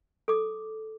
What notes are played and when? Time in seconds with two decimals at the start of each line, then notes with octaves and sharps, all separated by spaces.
0.28 A4 D6